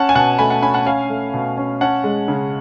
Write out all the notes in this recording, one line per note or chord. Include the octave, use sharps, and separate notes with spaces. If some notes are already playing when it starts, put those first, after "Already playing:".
Already playing: C#4 F#5 A5
G#5
B2 F#5 A5
A3 G#5 B5
F#5 A5
C#4 G#5 B5
F#5 A5
C#4 F5 G#5
A3
B2
C#4
C#4 F#5 A5
G#3
C#3